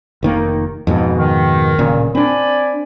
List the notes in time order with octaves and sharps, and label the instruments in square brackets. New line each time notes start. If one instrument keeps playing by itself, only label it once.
[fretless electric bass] F1 D#3 A#3
F2 G#2 B2
[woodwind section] D#3
[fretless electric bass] D1 A#2 C#3
[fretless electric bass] C4 D4 [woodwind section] D5 G#5 B5